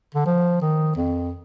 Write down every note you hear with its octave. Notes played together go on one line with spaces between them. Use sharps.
D3
F3
D#3
F2